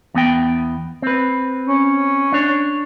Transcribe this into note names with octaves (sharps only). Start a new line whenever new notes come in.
E2 B3 G5
C4 B4
C#4
D4 C#5